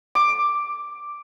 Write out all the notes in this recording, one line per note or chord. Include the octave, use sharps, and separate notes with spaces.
D6